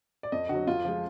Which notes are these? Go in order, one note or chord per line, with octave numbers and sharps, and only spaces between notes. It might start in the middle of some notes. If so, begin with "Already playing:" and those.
D5
F2 D#5
D3 F#3 F#4
F2 F4
F3 G#3